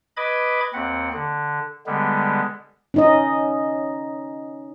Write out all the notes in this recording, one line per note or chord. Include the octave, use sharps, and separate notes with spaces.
B4 D#5 B5 D6 G#6
D#2 C4 F#5
D3
D3 G3 G#3 B3
C#4 D#4 D#5